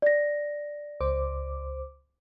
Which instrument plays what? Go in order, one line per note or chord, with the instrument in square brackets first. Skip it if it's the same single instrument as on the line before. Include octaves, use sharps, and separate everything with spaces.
[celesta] D5 A#6
[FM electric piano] C#2 C5 D6